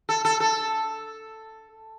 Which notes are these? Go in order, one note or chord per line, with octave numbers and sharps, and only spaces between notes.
A4
A4
A4